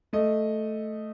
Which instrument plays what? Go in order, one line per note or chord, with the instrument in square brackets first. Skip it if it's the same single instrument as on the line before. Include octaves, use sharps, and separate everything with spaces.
[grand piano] A3 D#5